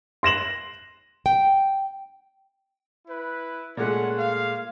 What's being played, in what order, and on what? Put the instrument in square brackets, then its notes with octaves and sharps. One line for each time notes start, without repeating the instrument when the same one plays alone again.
[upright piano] C6 A#6 E7 F#7
[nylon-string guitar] G5
[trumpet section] E4 B4
[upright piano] A#2 G#3 A3 [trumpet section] C#4 F#5
[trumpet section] F5